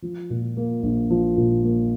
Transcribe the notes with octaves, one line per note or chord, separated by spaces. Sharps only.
F3
A#2
A#3
A#1
F3
A#2
A#3